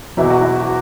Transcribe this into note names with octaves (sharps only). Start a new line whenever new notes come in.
E2 B2 F#3 E4
F#4
E4
F#4